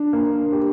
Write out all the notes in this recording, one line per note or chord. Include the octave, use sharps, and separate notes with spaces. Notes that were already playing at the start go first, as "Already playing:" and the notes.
Already playing: D4
A#3
G4